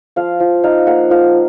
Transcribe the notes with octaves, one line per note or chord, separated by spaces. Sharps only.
F3 F5
F3
D#4 F5
A#3 F#5
F3 F5